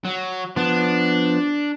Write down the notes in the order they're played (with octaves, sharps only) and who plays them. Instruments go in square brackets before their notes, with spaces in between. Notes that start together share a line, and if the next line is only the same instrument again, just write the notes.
[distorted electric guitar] F#3
[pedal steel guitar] F3 B3 [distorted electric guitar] D4